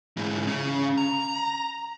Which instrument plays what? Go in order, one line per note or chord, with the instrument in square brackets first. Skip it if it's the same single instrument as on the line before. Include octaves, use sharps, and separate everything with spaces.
[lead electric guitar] G#2 E3
C#3
A#5